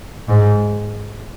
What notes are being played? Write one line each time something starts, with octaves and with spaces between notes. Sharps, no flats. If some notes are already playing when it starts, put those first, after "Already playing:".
G#2